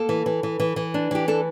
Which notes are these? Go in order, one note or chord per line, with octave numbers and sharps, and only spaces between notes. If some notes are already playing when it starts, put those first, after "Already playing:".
Already playing: A#3 A4
E3
E3
E3
E3
E3
D4
E3 G4
D4 A4